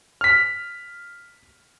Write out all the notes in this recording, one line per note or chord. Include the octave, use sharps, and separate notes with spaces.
F6 B6